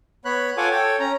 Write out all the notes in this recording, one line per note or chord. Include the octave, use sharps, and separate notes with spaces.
B3 C#5 B5 F#6
F4 A4 C#5 F#5 G#5 D6
A4 C#5 G5
C#4 A#5